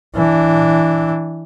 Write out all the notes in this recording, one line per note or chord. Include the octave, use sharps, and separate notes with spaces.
E3 D4